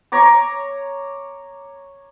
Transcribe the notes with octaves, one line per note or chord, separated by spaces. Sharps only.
C#5 A#5 C#6 D6